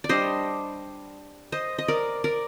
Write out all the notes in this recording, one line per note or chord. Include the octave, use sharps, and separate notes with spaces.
D5
G3 D4 C5 D#5
C5 D#5
D#5
A#4 D5
A#4 D5